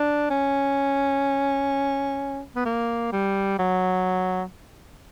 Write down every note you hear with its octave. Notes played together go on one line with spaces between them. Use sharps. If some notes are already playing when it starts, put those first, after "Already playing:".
Already playing: D4
C#4
B3
A#3
G3
F#3